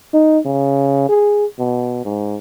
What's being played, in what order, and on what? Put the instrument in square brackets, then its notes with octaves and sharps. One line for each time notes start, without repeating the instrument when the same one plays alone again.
[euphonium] D#4
C#3
G#4
B2
G#2